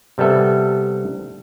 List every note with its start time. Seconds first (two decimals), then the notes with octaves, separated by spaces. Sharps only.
0.18 C3 G3 B3 A4 E5